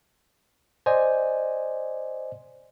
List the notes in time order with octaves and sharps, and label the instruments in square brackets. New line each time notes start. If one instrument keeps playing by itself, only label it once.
[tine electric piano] C5 D5 D#5 G#5